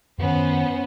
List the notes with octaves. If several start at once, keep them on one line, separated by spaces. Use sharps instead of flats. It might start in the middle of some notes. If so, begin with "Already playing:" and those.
F#2 D#3 B3 C#4 C5